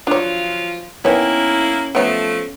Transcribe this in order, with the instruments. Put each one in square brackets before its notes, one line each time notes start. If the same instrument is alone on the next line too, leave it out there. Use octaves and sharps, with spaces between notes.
[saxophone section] F3 F#3 F4 [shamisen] D4 C#5
[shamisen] D#3 B3 [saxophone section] A#3 E4 [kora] C#4
[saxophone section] F3 A3 [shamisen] B3 C#5